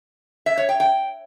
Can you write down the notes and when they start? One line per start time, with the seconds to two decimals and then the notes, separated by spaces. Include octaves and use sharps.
0.46 E5
0.57 C#5
0.69 G5
0.80 G5